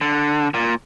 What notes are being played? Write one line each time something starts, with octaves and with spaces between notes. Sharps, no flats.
D3
A#2